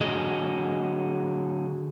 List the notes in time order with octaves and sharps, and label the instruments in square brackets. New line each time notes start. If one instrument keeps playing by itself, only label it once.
[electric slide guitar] D3 F#3 G#4 D#5